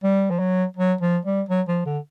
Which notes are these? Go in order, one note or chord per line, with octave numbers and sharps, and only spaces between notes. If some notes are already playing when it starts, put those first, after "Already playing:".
G3
F3
F#3
F#3
F3
G3
F#3
F3
D3